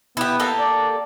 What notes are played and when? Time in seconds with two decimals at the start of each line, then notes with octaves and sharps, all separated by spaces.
0.17 B3 E4 G4
0.40 A#3 G4 A4
0.59 D5